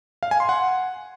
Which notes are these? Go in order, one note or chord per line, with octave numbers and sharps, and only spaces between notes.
F5
G#5
C6
F#5